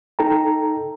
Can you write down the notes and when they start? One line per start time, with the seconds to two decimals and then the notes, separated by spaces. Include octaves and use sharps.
0.19 D#4 A4 G5 A#5